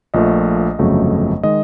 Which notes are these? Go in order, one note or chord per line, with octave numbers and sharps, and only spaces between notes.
A#1 A#2 F3 A3 D#5
G1 F2 C#3 F#3 A3
D#3 G#3 D#5